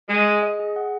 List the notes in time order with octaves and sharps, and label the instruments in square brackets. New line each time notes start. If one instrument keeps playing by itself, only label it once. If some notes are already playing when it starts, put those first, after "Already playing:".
[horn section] G#3 [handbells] G#4
[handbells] G#4
D#5
G#4
F#5